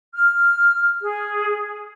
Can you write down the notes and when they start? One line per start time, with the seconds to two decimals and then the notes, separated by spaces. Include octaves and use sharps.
0.14 F6
1.01 G#4